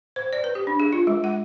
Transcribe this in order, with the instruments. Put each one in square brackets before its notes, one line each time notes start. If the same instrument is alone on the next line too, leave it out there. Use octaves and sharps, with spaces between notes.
[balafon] C5
D5
B4
G4
D4
G#4
F4
G#3
F#5